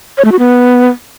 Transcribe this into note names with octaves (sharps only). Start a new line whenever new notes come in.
C#5
A3
F#4
B3